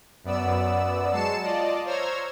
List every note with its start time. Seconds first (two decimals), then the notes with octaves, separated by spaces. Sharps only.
0.24 F#2 B3 D5 E6
1.12 F#3 G#3 A5 C7 C#7 E7
1.41 F4 D5 D#5 A5
1.85 C5 C#5 A#5 E6 F6 G#6